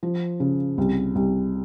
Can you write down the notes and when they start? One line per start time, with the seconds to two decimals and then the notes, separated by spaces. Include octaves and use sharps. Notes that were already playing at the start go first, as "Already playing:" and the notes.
0.03 F3
0.40 C#3
0.78 C2
1.15 C2